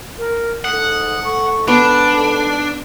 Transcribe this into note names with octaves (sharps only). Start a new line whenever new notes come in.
A#4
G#2 A4 F#5 D#6
C#6
B3 D4 A5